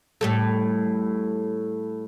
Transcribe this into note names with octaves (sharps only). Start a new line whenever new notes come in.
A2 G3 A4